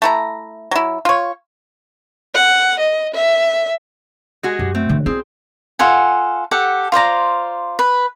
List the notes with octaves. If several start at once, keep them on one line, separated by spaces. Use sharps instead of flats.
A3 E4 A#5
F#3 E4
F4 C#5
F#5
D#5
E5
G#3 F#4 G#4
F#2 G4
A3 C4
D3 E3
C4 C#4 E4 G#4
F4 A4 F#5 G#5
G4 A4 F#5
F4 C5 D5 A#5
B4